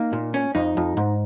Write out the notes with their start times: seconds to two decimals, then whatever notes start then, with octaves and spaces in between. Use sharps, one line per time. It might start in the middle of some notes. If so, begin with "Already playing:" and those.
Already playing: A#3 D#4
0.13 A#2
0.34 C#4
0.55 F2 D#4
0.77 F2
0.97 G#2